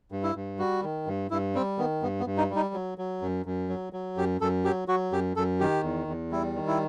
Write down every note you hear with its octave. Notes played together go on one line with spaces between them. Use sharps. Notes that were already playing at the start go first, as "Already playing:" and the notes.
G2
E4
G2
G3 F#4
D#3
G2
G2 E4
G3 C4
D#3 B3
G2 B3
B3
G2
D#4
G3
D#4
F#3
F#3
F#2
F#2
F#3
F#3
F#2 G4
F#2 A4
F#3 G4
F#3 F#4
F#2 G4
F#2 A4
D#3 G4
E2
E2
G3 E4
D#3
E4